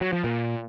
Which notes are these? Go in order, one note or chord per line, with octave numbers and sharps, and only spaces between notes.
F#3
F3
A#2